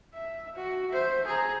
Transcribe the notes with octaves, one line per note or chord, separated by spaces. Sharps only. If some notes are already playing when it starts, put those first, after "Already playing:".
E5
F#4
C5 E5
G#4 A#5